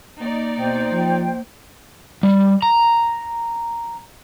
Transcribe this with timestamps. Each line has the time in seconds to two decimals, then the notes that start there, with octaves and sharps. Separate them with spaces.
0.20 A#3 D#4 D5
0.59 B2 C5 G5
0.91 F3
2.23 G3
2.62 A#5